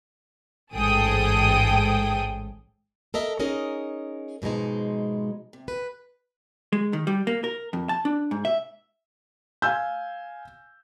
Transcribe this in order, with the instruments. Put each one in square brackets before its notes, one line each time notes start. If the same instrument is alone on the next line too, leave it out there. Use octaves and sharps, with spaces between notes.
[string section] A1 G#2 G#4 A4 G5 D#6
[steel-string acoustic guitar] A4 A#4 D#5 E5
C#4 D#4 G#4 A#4 D#5
G#2 B2 F3 G#3 D#4
C3
B4
[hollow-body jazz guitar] G#3
D#3
G3
A#3
A#4
F2
A5
D4
G#2
E5
[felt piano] F5 G#5 E6 G6